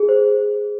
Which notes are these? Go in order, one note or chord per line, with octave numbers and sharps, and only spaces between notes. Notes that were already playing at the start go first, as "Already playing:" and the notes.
Already playing: G#4
C5